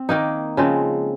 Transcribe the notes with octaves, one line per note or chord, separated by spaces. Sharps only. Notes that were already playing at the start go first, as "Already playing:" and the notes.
Already playing: C4
D#3 A#3 D#4
C#3 F3 G#3 C4